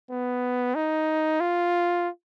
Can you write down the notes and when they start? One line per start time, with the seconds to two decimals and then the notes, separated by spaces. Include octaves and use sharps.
0.10 B3
0.75 D#4
1.40 F4